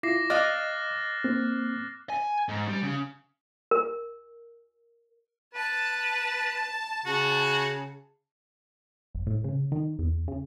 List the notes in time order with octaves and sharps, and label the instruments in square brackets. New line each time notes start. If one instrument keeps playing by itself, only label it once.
[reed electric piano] E4 F4 [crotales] D6 A#6 C7
[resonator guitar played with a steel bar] D#5 F5 [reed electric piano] D6 [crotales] F6 F#6 A6
[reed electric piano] A#3 C4
[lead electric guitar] G#5
G#2
G3
C#3
[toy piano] A#4
[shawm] B4 [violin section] A5
[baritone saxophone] C#3 [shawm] F#4
[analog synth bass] F#1
A2
C#3
D#3
E2
C#3